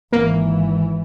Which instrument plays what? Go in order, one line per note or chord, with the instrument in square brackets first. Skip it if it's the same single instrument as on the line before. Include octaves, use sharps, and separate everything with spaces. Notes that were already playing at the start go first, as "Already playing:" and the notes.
[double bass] G#1 E3 [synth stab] A#3